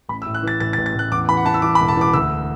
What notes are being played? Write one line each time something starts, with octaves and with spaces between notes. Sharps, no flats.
A1 B5
E6
A2
F#6
E3 A6
A1 A6
A6
A1
A6
A1 F#6
E2 D6
E3 B5
F#5
E3 A5
E6
E3 D6
B5
E1
A5
E3 D6
D2 E6